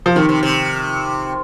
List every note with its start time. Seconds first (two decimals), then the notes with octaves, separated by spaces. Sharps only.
0.06 F3
0.16 C3 D#3
0.29 C3
0.43 C3